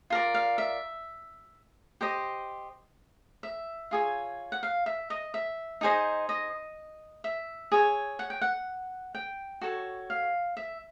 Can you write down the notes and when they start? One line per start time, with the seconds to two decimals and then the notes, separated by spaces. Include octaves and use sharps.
0.10 F4 A#4 D5
0.34 F5
0.58 E5
2.01 G4 C5 D#5
3.43 E5
3.91 F4 G#4 C#5
4.52 F#5
4.63 F5
4.86 E5
5.10 D#5
5.34 E5
5.81 D#4 G#4 C5 D#5
6.29 D#5
7.24 E5
7.72 G#4 C#5
8.19 F#5
8.30 G5
8.41 F#5
9.15 G5
9.61 F#4 A4 C#5
10.10 F5
10.57 E5